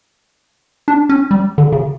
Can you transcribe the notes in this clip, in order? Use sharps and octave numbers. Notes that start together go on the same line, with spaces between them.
D4
C#4
G3
D3
C#3